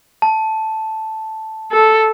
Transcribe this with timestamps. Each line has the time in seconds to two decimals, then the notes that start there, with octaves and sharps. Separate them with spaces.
0.22 A5
1.72 A4